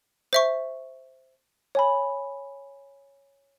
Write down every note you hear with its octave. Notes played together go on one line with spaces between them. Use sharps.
C5 E5 C#6
C#5 G#5 B5